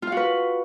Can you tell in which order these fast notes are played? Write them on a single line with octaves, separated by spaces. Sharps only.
F4 F5 F#4 B4